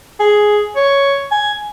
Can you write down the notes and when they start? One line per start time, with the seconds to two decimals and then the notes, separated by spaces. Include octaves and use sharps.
0.20 G#4
0.76 C#5
1.31 G#5